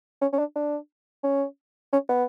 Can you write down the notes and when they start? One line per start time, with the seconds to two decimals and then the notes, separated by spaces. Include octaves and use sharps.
0.22 C#4
0.33 C#4
0.39 D4
0.56 D4
1.24 C#4
1.93 C#4
2.09 B3